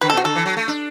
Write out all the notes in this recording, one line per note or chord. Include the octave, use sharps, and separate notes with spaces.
D3 B4
A4
B2 F#4
D3 A4
E3
F#3
A3
D4